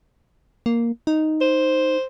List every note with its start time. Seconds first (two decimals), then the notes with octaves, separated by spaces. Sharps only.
0.66 A#3
1.07 D#4
1.41 C5